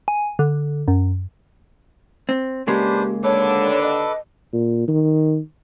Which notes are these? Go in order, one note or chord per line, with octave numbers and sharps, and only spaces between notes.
G#5
D3
F#2
C4
C#3 G#3 A#3 D4 G4 B4 C5
D#2 D3 D4 A4 B4 C#5 D6
D#5
A#2
D#3